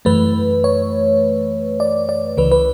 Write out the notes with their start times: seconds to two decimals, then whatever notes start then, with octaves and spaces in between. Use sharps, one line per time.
0.05 F#2 E3 A3 B4
0.64 C#5
1.80 D5
2.09 D5
2.37 C#2 C#3 E3 B4
2.52 B4